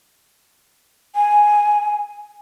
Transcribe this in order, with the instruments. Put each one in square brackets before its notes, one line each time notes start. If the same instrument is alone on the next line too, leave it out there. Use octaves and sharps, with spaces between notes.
[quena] G#5